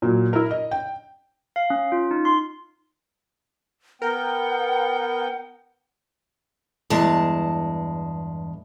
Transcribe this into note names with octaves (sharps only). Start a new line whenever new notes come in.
A#2 F#3
E4 A#4
D#5
G5
F5
C#4
F4
D#4
C6
B3 A#4 F#5 G5
E2 G2 G#3 A5